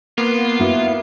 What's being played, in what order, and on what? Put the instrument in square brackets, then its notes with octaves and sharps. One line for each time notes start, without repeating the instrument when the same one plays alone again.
[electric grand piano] A#3 [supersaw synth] B3 C7 [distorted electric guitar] F4
[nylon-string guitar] E4 F#4